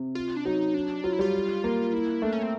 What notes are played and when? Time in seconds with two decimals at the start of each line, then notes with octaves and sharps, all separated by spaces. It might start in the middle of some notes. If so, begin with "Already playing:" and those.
Already playing: C3
0.15 F4
0.37 D4
0.45 F#3 D#4
0.74 D4
1.04 F#3 F4
1.13 E4
1.19 G3 F4
1.64 A#3
1.93 E4
2.22 A3 D4
2.33 C#4
2.43 C4